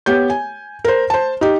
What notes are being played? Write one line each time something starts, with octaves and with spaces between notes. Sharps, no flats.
B3 G4 C#5 G6
G#5
A#4 C5
C5 A5
D#4 G4